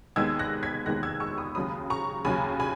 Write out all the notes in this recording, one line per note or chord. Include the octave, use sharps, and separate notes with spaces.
D#2 D#3 G#3 B3 E6 G#6
F#6 A#6
G#6 B6
D#2 D#3 G#3 B3 F#6 A#6
E6 G#6
C#6 E6
B5 D#6
D#2 C#3 F#3 B5 D#6
A#5 C#6
D#2 C#3 F#3 G#5 B5
G#5 B5